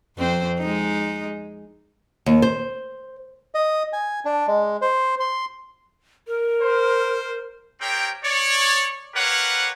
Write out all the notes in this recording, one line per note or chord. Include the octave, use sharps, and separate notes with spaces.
F2 C4 C5
G#3 D#4
D#2
C5
D#5
G#5
D4
G#3
C5
C6
A#4
C5
C4 G4 A#4 C#5 G5
C#5 D5
G4 A#4 B4 C#5 F5 F#5